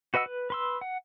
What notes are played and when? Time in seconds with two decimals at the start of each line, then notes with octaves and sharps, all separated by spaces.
0.14 F#4 B4 D#5 F#5 E6
0.26 B4
0.50 B4 C6 E6
0.81 F#5